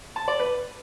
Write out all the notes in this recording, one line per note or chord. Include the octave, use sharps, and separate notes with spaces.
A5
D5
B4